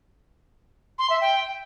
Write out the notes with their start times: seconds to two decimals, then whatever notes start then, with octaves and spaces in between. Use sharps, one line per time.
0.99 C6
1.10 E5
1.21 G5